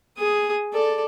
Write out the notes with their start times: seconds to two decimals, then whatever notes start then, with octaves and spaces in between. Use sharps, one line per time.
0.18 G#4 D#6
0.73 A4 D5